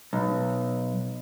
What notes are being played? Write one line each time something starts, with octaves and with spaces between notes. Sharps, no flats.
B1